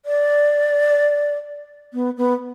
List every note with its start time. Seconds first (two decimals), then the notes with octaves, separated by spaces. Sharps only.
0.06 D5
1.94 B3
2.17 B3